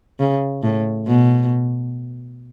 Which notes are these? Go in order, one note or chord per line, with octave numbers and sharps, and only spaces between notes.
C#3
A2
B2